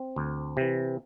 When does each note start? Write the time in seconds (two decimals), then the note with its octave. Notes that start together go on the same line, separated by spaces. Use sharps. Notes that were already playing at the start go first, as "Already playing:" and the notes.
Already playing: C4
0.16 D2
0.57 C3 E3